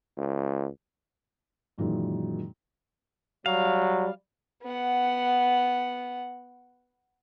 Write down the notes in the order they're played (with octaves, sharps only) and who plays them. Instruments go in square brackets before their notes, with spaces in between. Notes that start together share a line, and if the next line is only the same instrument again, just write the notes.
[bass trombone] C#2
[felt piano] F#2 A#2 D#3 E3 F#3 G#3
[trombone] F#3 [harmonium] G3 [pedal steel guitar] F5
[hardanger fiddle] B3 F#5